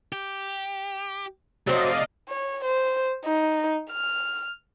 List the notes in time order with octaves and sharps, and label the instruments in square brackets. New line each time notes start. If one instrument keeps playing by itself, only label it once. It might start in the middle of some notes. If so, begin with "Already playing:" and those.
[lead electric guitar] G4
[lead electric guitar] C3 A3 [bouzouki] F#3 C4 [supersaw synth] D5 D#5 F5
[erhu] C#5
C5
D#4
F6